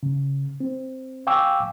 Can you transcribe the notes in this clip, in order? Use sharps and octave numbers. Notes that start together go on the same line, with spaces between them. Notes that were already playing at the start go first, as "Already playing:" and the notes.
C#3
C4
F5 G5 G#5 C#6 D6 E6